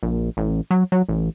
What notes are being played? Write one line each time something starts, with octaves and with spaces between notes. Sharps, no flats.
A#1
A1
F#3
F#3
A1